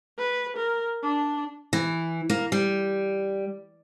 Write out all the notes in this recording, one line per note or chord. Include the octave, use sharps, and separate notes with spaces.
B4
A#4
D4
E3
A#3
G3